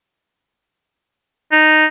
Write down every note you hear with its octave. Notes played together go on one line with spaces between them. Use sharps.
D#4